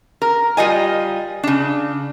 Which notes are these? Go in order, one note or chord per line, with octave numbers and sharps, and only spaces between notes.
A#4
G3 F4 D#5 G#5
C#3 D4